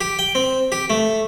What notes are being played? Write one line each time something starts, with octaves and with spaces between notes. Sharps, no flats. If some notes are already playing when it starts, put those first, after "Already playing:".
G4
G5
C4
G4
A3